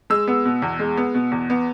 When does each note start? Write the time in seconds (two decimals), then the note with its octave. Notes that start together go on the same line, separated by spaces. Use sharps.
0.10 G#3 E6
0.27 B3
0.45 B2
0.62 E2
0.79 G#3
0.97 B3
1.15 B2
1.32 E2
1.50 B3